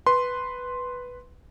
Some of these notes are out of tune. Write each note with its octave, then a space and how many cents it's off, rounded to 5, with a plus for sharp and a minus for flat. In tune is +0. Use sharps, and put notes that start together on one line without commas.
B4 +0 C6 +0